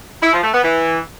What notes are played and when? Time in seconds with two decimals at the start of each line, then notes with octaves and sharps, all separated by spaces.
0.22 E4
0.33 F3
0.43 A3
0.53 B3
0.63 E3